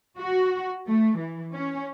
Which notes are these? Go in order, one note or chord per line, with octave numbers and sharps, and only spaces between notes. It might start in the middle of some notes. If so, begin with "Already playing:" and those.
F#4
A3
E3
C#4